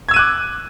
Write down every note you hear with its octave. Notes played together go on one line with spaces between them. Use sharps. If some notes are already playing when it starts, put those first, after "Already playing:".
D6 E6 F#6 G#6 D#7